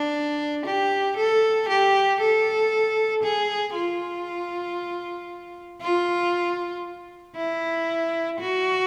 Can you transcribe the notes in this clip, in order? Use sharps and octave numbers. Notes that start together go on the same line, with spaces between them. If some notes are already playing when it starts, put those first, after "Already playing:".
Already playing: D4
G4
A4
G4
A4
G#4
F4
F4
E4
F#4